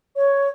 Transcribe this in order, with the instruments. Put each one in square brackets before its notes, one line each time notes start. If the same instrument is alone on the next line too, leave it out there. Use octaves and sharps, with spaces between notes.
[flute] C#5